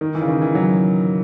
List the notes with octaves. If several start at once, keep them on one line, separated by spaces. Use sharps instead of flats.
D#3
E3
C#3
D#3
E3
F#3